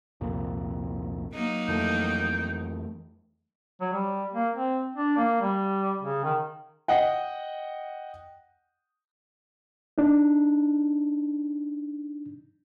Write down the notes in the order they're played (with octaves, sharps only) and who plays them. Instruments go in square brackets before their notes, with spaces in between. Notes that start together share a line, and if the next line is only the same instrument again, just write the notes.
[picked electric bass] C2 F2 A#2
[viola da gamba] F#3 A#3 D#4
[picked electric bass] F2 E3 A3 [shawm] G5
[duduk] F#3
G3
A#3
C4
D4
A#3
G3
C#3
D#3
[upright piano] D#5 F#5 G5
[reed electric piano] D4 D#4